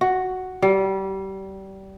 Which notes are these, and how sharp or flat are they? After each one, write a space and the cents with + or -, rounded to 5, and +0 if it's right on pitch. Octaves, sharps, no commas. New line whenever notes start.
F#4 +5
G3 -25